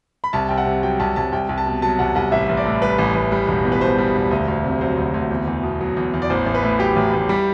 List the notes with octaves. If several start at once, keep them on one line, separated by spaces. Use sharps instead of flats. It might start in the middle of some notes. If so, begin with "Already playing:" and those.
B5
C2 A5
C2 G5
F#5
C3
F#3 G5
C2 A5
C2 A5
C2 G5
C2
A5
B2
F#3 A5
C2 F#5
C2 F#5
A1 E5
A1
D5
A2
G3 B4
A1
A1
G3
E1
E2
B4
B2 C5
G3
E1
D2
D2
C3
F#3 C5
D2
D2
E2
E2
B2
F#3
E2
E2
D5
A1 C5
A1
B4
A2
F#3 G4
A1
A1
G3